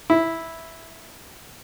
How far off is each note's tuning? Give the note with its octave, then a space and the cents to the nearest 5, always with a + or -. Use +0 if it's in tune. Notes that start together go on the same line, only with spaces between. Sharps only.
E4 -5